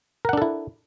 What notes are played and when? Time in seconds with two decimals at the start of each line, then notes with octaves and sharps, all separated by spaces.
0.25 A#4
0.29 F#5
0.33 D4
0.37 A4
0.42 E4